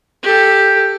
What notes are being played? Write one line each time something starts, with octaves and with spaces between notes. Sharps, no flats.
G4 A4